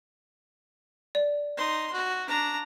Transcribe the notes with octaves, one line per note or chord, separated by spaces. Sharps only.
D5
D#4 C6
F#4
D4 A#5